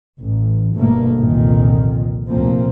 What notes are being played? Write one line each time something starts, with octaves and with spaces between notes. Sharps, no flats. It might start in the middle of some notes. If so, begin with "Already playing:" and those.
A1
G1 G2 B2 A3 A#3
G1 C2 F2 A#2 D#3
F1 D2 A#2 F3 A#3 C4